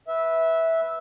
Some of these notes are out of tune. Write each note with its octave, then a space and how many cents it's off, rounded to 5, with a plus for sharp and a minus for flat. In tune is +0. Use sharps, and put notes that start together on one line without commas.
B4 -5 E5 -10